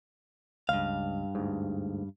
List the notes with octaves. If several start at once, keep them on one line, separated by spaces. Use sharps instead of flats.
C#2 G2 F5
D2 G#2